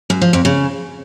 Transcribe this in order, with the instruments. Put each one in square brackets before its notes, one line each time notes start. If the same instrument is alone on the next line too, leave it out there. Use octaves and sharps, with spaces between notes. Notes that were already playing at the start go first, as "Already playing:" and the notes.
[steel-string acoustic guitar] F#2
F3
F2
C#3